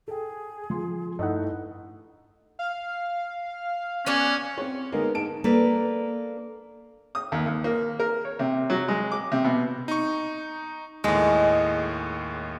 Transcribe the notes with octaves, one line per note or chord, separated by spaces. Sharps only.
G#4 A4 G5
F3 C6
G2 A3 D#4 E4 D#5 F#5
F5
B3 C#4 D4 F#4
C4 C#5
D3 G#3 A#3 B3 D#4 A#4
G#2 A5 D7
A#3 D4 A4 B4
D#6
D#2
D#2
A#3
A#4
C#5
C3
F#3
G#3
D6
C3
B2
D#4 C#6
D#2 A2 G#3